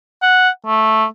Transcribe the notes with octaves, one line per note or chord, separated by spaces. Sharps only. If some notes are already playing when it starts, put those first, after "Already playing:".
F#5
A3